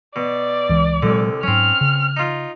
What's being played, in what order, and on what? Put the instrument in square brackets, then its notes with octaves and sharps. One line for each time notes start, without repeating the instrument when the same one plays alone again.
[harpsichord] B2 [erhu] D5
[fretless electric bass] C#2 E3
[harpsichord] C2 D3 [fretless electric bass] A#2 F#3 G#3
[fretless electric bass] G#2 F#3 [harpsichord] C4 C#4 [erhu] F6
[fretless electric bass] C#3
[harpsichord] D#4 F4